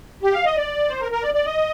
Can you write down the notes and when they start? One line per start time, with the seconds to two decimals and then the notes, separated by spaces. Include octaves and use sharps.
0.23 G4
0.33 F5
0.45 D#5
0.57 D5
0.89 C5
1.00 A#4
1.12 A#4
1.23 D5
1.34 D5
1.46 D#5